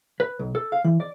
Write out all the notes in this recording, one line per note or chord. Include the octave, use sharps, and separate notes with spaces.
B4
B1
A4
F5
E3
D5